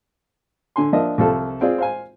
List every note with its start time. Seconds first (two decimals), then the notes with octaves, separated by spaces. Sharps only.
0.76 D3 G#5 C6
0.93 F3 A#3 D4 D#5 E5
1.18 C2 F3 A4
1.61 C4 F4 G#4 D5
1.78 C5 F5 G#5